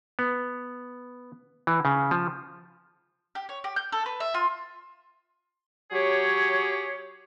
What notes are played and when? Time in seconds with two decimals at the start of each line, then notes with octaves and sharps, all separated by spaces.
0.19 B3
1.67 E3
1.85 C#3
2.11 F3
3.35 G4
3.49 C#5
3.64 G4
3.76 G6
3.92 A4
4.06 B4
4.20 E5
4.34 F4
5.91 F#3 G4 G#4 C#5